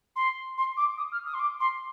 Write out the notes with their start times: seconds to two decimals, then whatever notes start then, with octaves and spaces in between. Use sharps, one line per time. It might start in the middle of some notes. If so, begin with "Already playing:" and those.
0.16 C6
0.58 C6
0.77 D6
0.97 D#6
1.12 F6
1.26 D#6
1.34 C6
1.39 D6
1.60 C6